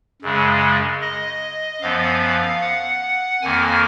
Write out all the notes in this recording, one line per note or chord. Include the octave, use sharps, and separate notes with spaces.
F#2 C#3 G#3
D#5
F#2 F3 B3 F5
F#5
F2 D#3 A#3 G#5